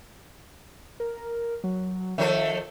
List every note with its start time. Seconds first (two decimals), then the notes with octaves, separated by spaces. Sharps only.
1.00 A#4
1.64 F#3
2.18 D#3 F3 A4 E5